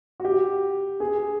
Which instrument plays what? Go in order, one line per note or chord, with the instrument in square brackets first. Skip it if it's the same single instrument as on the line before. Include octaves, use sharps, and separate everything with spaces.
[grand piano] F#4
G4
G#4